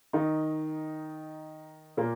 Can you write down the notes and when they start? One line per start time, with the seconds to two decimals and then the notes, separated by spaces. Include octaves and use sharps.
0.13 D#3 D#4
1.97 A#2 A#3